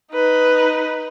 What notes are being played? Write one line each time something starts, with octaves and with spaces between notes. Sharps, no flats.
D#4 B4